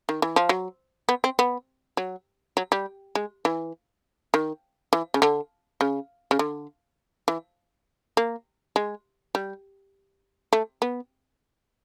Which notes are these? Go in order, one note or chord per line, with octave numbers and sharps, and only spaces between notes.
D#3
E3
F3
F#3
B3
C4
B3
F#3
F#3
G3
G#3
E3
D#3
E3
C#3
D3
C#3
C#3
D3
E3
A#3
G#3
G3
A3
B3